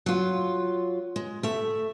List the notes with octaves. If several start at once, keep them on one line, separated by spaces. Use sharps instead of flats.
F#3 F4
G#3
A3 E5